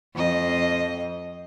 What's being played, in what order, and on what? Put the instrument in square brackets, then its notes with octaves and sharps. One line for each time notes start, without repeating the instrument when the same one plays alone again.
[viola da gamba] F2 D#5